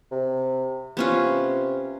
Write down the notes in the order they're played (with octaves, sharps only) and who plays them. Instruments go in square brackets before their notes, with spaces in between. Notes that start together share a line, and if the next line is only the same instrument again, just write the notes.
[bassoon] C3
[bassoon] C3 [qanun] B3 C#4 F4